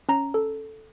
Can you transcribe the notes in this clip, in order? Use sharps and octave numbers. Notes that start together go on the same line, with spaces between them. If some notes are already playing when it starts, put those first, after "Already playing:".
C#4 A#5
A4